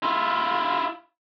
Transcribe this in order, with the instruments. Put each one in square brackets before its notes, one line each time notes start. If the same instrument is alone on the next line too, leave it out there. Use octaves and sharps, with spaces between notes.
[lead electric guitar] E4 F4